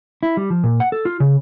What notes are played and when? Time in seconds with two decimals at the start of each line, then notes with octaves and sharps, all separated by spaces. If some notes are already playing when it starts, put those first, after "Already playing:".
0.23 E4
0.37 G3
0.50 F3
0.64 A#2
0.80 F#5
0.92 A4
1.05 F4
1.20 C#3